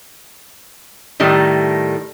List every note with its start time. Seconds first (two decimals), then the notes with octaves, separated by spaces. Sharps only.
1.20 A2 D#3 G3 A3